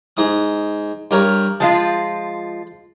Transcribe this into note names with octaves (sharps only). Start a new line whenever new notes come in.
G#2 D#6
G2 A#4 C#5
F3 G#3 F4 A5